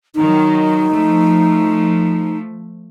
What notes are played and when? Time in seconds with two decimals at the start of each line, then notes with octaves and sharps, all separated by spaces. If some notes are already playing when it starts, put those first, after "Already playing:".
0.15 D#3 F#3 D#4
0.91 F3 A3